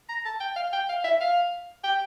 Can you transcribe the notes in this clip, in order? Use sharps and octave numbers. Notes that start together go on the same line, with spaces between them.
A#5
A5
G5
F5
G5
F5
E5
F5
G5